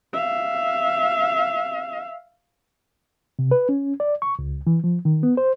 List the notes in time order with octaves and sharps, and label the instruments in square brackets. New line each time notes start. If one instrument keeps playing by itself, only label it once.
[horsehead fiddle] E5 F5
[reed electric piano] C3
B4
C#4
D5
C#6
C#2
E3
F3
D#3
B3
C5